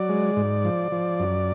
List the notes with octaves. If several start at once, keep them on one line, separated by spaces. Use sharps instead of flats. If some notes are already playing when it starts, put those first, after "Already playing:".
Already playing: F#3 D5
G#3
G#2
F3
F3
F#2